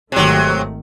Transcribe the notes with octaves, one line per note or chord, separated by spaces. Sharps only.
G#1 C3 D#3 F#3 A3